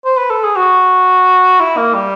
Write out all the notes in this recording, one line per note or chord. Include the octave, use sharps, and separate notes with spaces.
C5
B4
A4
G#4
F#4
E4
A#3
G3